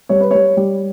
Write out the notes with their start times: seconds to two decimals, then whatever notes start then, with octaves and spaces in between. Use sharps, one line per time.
0.09 G3 C#5
0.20 B4
0.31 G3 C#5
0.57 G3